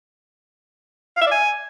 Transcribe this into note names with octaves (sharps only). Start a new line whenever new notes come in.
F5
E5
D5
G#5